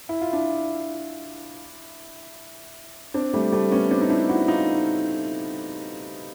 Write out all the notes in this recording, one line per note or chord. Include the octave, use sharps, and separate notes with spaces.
E4
F4
D4 E4
C4 D4
G3 A3
G3 A3
B3 C#4
C4 D4
D#4
D4 E4
E4 F#4
D#4 F4